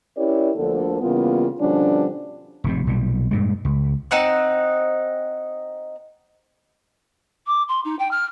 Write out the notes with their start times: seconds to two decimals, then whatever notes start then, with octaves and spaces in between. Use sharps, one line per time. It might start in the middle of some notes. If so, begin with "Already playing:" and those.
0.16 C#4 E4 G4 A#4 C#5 D5
0.56 D2 D3 F3 A#3 A4
1.01 C#3 E3 G3 A#3 B3 F4
1.60 B2 D3 F3 G3 C#4 D4
2.64 F1 G#2 C3
2.87 B1 A#2 G3
3.31 G2 A#2 G#3
3.65 C#2
4.11 C4 D#4 F#5 F#6
7.47 D6
7.68 C6
7.85 D#4
7.99 G5
8.11 F6